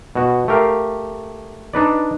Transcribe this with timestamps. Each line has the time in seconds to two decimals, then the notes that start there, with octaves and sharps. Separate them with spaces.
0.15 B2 F#4
0.48 A3 G4 A#4 F5
1.74 D4 D#4 B4 D5